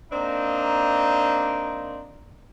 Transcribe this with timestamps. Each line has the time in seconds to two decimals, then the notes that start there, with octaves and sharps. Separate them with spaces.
0.12 A#3 C4 D4 D#4